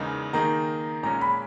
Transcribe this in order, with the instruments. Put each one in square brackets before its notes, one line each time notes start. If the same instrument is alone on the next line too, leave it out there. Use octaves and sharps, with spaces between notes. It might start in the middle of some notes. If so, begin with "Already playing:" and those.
Already playing: [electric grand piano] E2 C#3 G#3 D#4 A#4
[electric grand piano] D#3 A#3 D#4 G#4 [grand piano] A#5
[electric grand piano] A#2 G#3 C#4 [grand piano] A#5
[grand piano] B5